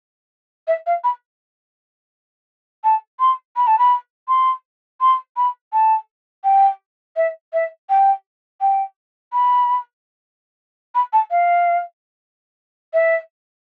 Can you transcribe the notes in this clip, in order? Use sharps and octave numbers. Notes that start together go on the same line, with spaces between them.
E5
F5
B5
A5
C6
B5
A5
B5
C6
C6
B5
A5
G5
E5
E5
G5
G5
B5
B5
A5
F5
E5